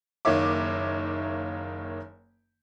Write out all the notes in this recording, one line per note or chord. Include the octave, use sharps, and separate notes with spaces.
F#1 D#3 A#3 C#5 E5 D6